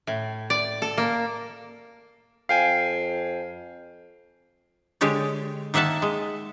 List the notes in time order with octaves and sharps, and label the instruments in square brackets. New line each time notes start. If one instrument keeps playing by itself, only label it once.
[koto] A2
D5
A4
A#3
[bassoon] F2 [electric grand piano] F5 G5 G#5 [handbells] C7
[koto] D3 G#3 G4 C#5 D5
D#3 A#3 E5 F#5 A5
G#3